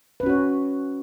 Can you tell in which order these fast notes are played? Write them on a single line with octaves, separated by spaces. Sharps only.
B4 C#4 F#4 C#5